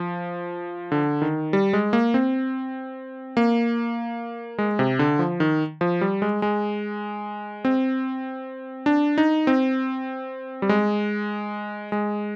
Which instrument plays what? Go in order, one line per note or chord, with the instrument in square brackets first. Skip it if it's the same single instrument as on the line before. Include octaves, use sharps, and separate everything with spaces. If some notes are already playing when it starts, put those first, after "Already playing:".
Already playing: [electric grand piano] F3
D3
D#3
G3
G#3
A#3
C4
A#3
G#3
C3
D3
F3
D#3
F3
G3
G#3
G#3
C4
D4
D#4
C4
G3
G#3
G#3